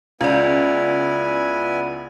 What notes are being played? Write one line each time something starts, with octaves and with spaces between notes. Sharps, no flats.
C#2 B3 E4 F4 D5 G#5